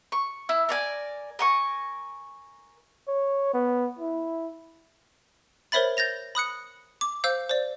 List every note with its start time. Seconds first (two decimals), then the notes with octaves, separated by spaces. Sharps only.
0.12 C#6
0.49 E4
0.69 A#4 D5 G#5
1.39 A#4 G#5 C#6
3.08 C#5
3.54 B3
3.99 E4
5.72 A#4 C5 C#5 E5 B5 A6
5.97 G6 A6 A#6 F7
6.35 B5 D#6 F#6 C#7
7.01 D6
7.24 C5 F5 E6 G6
7.50 C5 D5